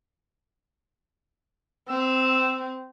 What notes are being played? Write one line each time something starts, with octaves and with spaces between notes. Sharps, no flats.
C4 E6